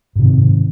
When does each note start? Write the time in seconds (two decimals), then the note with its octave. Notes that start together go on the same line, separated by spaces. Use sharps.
0.16 G#2
0.19 C3
0.22 D#3
0.25 C4